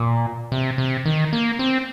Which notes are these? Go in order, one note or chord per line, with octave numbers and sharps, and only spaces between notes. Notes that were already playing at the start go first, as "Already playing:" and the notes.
Already playing: A#2
C3
C3
D#3
A#3
C4